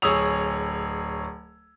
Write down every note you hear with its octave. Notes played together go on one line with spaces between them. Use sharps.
D1 G#4 C#5 D#6 E6 F7